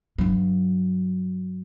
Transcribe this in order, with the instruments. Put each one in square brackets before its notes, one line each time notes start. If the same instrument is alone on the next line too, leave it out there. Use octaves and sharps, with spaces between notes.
[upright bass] G2 F#3